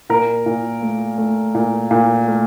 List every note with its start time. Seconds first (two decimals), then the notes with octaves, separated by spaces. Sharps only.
0.09 A#2 A#4
0.46 A#2
0.82 A3
1.18 A3
1.55 A#2
1.91 A#2
2.28 A3